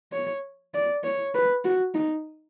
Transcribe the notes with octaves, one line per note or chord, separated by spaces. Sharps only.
C#5
D5
C#5
B4
F#4
D#4